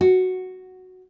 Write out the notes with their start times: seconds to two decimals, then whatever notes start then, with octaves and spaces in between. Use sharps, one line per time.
0.01 F#4